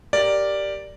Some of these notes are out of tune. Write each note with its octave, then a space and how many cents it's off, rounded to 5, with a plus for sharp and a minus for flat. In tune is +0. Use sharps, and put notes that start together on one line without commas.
G4 +0 A#4 +0 D5 +0